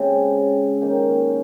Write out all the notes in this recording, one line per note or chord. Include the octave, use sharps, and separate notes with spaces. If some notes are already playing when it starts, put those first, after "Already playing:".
Already playing: C#3 G#3 C4 G4
D#3 A#3 C#4 G4